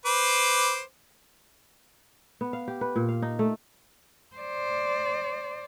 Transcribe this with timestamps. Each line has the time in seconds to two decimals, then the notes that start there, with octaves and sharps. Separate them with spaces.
0.05 B4 C5 D6
2.41 B3
2.53 F5
2.68 G4
2.81 B4
2.96 A#2
3.09 F5
3.22 D#4
3.39 A3
4.36 C5 D5